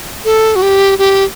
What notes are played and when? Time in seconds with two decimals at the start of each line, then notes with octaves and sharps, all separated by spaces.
0.25 A4
0.56 F#4
0.62 G4
0.99 G4